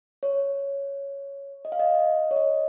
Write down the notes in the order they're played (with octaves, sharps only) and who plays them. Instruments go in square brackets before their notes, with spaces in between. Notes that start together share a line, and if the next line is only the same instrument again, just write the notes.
[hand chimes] C#5
D#5
F5
D#5
C#5
D#5